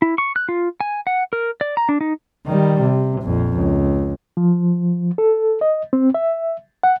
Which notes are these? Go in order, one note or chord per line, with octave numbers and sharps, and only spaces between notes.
E4
C#6
F#6
F4
G#5
F#5
A#4
D5
A#5
D4
D#4
D#3 G3
C3
A#1 F2
C#2
F3
A4
D#5
C4
E5
F#5